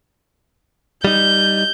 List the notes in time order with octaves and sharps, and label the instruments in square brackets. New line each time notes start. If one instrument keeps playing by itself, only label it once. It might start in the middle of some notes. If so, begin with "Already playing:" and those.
[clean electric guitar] G3 D#4 [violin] G6